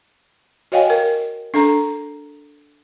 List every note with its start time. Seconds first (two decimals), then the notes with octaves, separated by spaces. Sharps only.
0.72 F#4 C#5 D#5 F5 G5 G#5
0.90 A#4
1.54 D4 A4 A#5